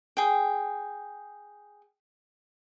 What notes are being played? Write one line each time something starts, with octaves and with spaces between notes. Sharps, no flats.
G#4 G5